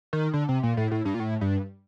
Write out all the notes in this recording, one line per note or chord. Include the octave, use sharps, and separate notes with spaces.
D#3
D3
C3
A#2
A2
A2
G2
A#2
A2
G2